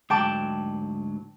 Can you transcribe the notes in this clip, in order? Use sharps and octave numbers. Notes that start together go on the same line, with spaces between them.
D2 G#2 F#3 G5 A5 D6